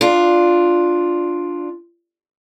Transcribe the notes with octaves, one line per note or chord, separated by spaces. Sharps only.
D4 F4